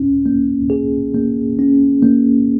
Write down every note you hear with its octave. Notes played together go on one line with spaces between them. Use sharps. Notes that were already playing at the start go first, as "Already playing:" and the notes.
Already playing: C#4
A#3
G#4
A#3
C#4
A#3